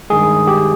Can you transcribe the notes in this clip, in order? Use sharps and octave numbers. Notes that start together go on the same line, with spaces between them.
G2 D#3 G#3 G#4
G4